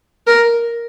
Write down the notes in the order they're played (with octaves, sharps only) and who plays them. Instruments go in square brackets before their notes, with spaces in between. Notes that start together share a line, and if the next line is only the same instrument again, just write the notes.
[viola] A#4